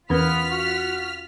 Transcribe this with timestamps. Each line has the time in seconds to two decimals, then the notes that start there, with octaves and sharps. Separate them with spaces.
0.10 E2 B3 C#4 F4 A#4 B4 F6 B6
0.51 F#4